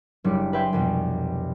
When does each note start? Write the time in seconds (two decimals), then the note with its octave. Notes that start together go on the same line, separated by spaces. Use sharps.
0.24 F#1 G3 D4 D5 C#7
0.53 B4 D5 E5 G5 G#5 C6
0.73 C2 F2 B2